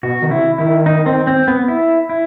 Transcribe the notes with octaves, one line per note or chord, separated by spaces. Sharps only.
B2 F#4
D#3
C3 E4
D#3 E4
D#4
C4
C4
B3
E4
E4